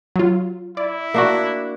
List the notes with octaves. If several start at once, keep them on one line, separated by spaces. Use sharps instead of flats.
F#3 F4
E4 D5
A#3 D4 F#4